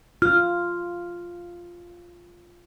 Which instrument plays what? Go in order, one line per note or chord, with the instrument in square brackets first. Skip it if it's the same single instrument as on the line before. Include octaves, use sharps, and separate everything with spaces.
[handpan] F4 [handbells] F6